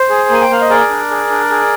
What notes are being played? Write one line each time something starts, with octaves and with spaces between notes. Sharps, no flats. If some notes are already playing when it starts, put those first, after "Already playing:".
Already playing: C5
G#4
A#3 G#5
G5
A#3 F5
D#5
G#4 A#4 D5
D4
G#4
D4
G#4